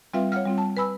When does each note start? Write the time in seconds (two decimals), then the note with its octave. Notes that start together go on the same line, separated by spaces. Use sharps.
0.14 G3 C4 F4 B4 E5 F5
0.32 C#5 F5 F#5 F6
0.46 G3 C4 F4
0.58 A5
0.77 B4 G#5 B5 E6